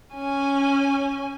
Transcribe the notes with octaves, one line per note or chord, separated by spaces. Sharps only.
C#4 G#5